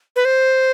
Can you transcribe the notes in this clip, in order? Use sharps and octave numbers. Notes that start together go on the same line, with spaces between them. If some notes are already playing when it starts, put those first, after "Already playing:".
B4
C5